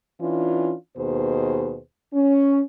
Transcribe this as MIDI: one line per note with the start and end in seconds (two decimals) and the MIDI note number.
0.21 0.74 52
0.21 0.74 61
0.21 0.74 62
0.21 0.74 65
0.96 1.78 39
0.96 1.78 47
0.96 1.78 68
0.96 1.78 71
0.96 1.78 72
2.13 2.61 61